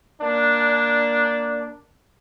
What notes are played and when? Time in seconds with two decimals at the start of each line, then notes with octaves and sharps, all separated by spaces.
0.22 A#3 D4